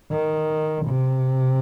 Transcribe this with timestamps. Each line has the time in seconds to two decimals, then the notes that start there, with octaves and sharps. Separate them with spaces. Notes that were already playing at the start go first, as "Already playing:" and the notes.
0.11 D#3
0.85 C3